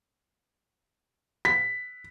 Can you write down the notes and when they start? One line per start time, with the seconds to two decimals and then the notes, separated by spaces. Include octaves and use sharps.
1.45 B6